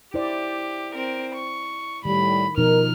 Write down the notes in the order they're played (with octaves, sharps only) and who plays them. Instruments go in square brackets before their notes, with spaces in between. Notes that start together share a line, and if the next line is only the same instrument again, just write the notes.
[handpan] E4 C5 D5 [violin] G4
[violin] C4 A#4
C#6
[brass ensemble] A2 G3 [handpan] D#3 [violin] B5
[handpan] B2 F3 D#4 [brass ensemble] A#4 [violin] F6